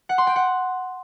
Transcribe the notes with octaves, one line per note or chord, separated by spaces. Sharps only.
F#5
C6
G5
F#5